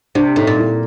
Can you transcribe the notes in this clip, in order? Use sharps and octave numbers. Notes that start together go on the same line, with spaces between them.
C3 D4
A2 D#4
A#2
E4